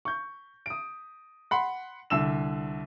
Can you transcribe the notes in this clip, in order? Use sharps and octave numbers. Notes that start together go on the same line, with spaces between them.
C#6 G6
D#6 D7
F#5 B5 C6
C2 D3 E6 E7